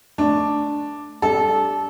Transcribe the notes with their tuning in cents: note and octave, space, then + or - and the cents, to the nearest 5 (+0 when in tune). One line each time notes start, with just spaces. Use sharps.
A3 +0 D4 +0
G3 +5 D4 -10 A4 -20